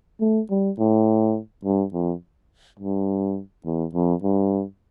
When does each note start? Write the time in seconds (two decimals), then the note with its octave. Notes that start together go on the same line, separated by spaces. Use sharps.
0.21 A3
0.50 G3
0.78 A2
1.64 G2
1.93 F2
2.79 G2
3.65 E2
3.94 F2
4.23 G2